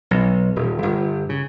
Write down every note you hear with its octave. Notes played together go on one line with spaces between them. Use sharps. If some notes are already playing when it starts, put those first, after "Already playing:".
B1
D#1
G1
C#3